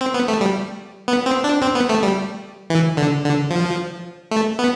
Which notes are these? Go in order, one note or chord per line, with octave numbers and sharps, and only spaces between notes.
C4
B3
A3
G3
B3
C4
D4
C4
B3
A3
G3
E3
D3
D3
F3
A3
B3